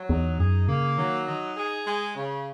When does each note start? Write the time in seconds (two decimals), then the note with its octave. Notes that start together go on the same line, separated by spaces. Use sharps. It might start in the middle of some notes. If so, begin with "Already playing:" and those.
Already playing: F#3
0.09 E2 D#4
0.39 F#2 G#4
0.68 C#3 A#3
0.98 D#3 F#3
1.28 D#4
1.56 G#4
1.87 G#3
2.16 C#3